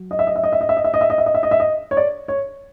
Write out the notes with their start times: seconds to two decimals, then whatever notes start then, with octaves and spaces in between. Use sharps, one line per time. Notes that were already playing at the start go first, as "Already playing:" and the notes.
Already playing: F#3
0.11 D#5
0.19 E5
0.27 D#5
0.36 E5
0.44 D#5
0.52 E5
0.61 D#5
0.69 E5
0.77 D#5
0.84 E5
0.94 D#5
1.01 E5
1.10 D#5
1.18 E5
1.26 D#5
1.34 E5
1.43 D#5
1.51 E5
1.60 D#5
1.91 C#5
1.97 D5
2.28 C#5